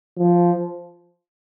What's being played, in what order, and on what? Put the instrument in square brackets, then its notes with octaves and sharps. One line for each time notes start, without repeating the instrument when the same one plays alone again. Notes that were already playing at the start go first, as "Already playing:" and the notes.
[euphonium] F3